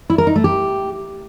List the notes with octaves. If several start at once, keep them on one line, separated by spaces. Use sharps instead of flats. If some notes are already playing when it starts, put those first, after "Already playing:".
E4
A#4
D#4
A3
G4